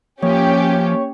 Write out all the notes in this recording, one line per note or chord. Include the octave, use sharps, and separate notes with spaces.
F3 A#3 C#4 G4 C#5